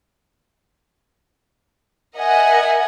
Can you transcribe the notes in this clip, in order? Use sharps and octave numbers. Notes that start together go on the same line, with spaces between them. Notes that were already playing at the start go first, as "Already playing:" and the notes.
A#4 D#5 E5 F#5 G#5